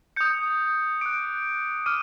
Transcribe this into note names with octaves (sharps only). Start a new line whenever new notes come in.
D#6 G6 C#7
D6 F#6 D7
D6 F6 D#7